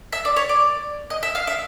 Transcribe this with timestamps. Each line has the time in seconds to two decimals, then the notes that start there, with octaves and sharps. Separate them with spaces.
0.12 E5
0.25 D5
0.36 C#5
0.49 D5
1.10 D#5
1.23 E5
1.35 F5
1.47 E5